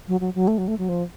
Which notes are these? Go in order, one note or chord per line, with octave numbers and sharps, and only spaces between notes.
F#3
F#3
F#3
A3
F#3
A3
F#3
F3